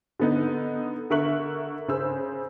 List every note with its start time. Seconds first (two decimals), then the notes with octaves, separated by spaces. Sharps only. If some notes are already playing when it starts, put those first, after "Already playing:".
0.20 D3 B3 D#4
1.10 D3 A#4 E5 C#6 F#6 F#7
1.88 C#3 C5 E6